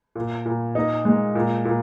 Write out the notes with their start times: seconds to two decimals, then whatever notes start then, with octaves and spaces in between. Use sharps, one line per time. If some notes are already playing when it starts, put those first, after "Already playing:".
0.15 A#2
0.46 A#2
0.75 D#4
1.05 G#3
1.35 A#2
1.65 A#2